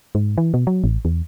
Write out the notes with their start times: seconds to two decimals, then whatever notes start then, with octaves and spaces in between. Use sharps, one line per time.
0.15 G#2
0.38 E3
0.54 B2
0.67 F#3
0.84 A1
1.05 E2